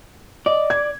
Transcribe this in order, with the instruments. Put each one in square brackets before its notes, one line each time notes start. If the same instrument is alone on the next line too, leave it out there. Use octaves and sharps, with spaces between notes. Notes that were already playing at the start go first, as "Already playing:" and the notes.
[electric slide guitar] D5 [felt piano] D#5
[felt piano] G#6